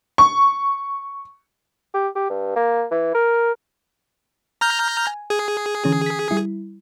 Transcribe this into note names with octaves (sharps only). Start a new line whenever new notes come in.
C#6
G4
G4
G2
A#3
E3
A#4
A#5 F6 G6
G#5
G#4
D3 E3 C#4
B6
G3 E4